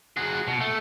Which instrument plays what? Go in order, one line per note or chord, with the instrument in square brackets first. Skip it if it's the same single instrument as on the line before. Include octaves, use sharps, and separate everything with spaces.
[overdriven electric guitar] F#4 G#4
B2
A3